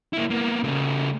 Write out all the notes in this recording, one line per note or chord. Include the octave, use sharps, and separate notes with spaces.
A#3 E4
A#3 B3
C#3 A3